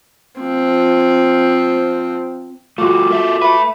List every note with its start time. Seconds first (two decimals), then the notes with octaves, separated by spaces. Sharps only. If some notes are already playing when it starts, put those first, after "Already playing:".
0.40 F3 C4
2.78 G3 A3 F4 F#4 D6
3.10 A4 A#4 E5
3.42 A3 B4 E5